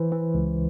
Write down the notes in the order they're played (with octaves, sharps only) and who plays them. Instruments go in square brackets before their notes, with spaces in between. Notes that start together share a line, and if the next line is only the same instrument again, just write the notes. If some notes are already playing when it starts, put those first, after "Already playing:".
Already playing: [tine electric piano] E3 C5
E3
C#2